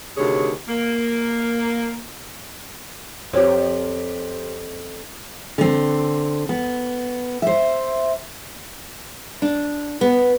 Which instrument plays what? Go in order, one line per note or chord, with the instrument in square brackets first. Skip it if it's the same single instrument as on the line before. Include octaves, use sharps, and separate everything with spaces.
[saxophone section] D2 C3 D#3 G#4 C#5
A#3
[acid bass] F2 [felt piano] C4 G4 [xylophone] C5 C#5
[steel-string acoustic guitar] D3 C4
B3
C5 E5
[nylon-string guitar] D4
B3